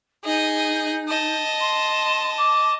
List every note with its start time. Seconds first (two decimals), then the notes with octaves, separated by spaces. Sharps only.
0.24 D#4 G#4 D#5
1.08 D#5 A5
1.60 C6
2.37 D6